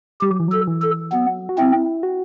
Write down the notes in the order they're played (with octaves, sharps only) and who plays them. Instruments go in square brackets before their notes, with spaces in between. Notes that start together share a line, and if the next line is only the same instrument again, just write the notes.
[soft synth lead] G3 [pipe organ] G4
[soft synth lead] F#3
E3
[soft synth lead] F#3 [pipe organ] A4
[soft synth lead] E3
[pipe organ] A4
[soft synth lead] F#3 [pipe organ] B3
[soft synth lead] F#4
[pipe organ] C4 [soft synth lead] E4
[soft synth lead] F#4